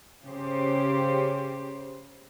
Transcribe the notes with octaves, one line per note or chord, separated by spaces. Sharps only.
C#3 G4 C5